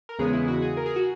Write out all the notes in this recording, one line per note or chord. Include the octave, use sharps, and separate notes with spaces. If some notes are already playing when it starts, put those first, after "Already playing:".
A#4
E2 C#3 G#3 B3 G#4
E4
F#4
G#4
A#4
G#4
F#4